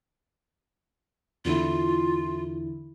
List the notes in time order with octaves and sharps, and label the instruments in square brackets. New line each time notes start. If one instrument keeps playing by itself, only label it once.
[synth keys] E2 D3 E4 [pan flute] F4